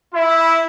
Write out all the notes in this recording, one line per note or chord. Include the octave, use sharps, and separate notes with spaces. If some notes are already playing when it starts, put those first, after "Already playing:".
E4